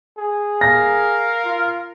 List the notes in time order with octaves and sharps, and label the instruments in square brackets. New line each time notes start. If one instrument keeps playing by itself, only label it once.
[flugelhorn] G#4
[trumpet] A#4 [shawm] F5 [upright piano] A#6
[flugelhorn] F4